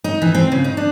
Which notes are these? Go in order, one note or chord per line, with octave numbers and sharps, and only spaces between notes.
D#4
E3
C4
C#3
D#4
D4